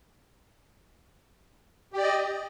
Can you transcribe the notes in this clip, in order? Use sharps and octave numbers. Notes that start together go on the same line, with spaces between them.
G4 D5 D#5